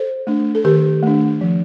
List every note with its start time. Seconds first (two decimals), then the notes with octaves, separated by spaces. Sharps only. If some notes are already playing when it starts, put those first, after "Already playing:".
Already playing: A4 C5
0.27 A3 D4
0.55 A4
0.64 D#3 G4 A#4
1.03 A3 D4
1.41 F3